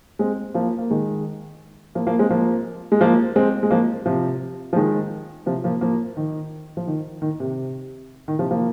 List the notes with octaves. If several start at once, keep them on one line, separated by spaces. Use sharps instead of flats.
G#3 C4
F3 A#3
A#3
D#3 G#3
F3 A#3
F3 A#3
G#3 C4
F3 A#3
G#3
F3 A#3
G#3 C4
G#3
F3 A#3
C3 F3
F3
D#3 G#3
C3 F3
F3 A#3
F3 A#3
D#3
F3
D#3
D#3
C3
D#3
C3 F3
F3 A#3